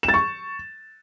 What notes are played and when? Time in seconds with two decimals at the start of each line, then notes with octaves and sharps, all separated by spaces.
0.03 E7
0.08 A6
0.14 C#6